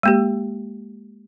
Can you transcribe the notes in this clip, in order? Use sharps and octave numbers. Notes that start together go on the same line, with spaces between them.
G#3 A#3 G4